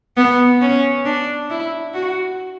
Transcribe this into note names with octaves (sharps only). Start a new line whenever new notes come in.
B3
C#4
D4
E4
F#4